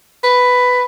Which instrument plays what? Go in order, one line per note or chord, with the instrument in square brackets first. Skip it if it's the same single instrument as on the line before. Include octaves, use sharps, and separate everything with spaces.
[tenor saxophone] B4